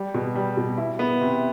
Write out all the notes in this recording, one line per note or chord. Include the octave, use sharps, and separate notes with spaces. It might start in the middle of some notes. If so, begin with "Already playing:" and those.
Already playing: G3
B2
G3
B2
E4
B3
C3